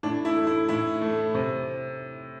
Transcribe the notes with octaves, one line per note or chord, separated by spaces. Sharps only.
A2 D4
E4
A3
E4
A2 E4
A3
C3